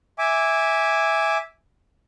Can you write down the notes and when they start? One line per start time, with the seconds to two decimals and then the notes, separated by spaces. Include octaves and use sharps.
0.19 E5 G#5 D6